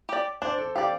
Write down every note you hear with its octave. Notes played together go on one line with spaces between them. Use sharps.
G4 D5
D4 C5
A4
G4 D5 F5